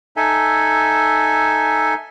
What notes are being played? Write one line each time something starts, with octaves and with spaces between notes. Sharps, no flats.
D#4 A4 E5 G#5